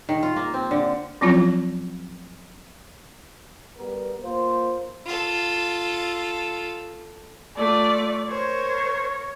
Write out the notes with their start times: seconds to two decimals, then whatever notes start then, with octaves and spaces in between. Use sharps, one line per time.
0.09 D#3
0.23 F4
0.36 A#3
0.54 C4
0.71 D3
1.21 F3 F#3 C4 C#4 E4 F4
3.77 G3 B3 A#4
4.22 A#3 F4 C5
5.06 F4 A4
7.57 A3 F4 D5
8.29 A#4 C5 C#5